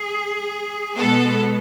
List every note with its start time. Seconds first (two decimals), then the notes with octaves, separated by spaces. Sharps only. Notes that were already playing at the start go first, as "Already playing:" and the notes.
Already playing: G#4
0.98 B2 G#3 B3 A4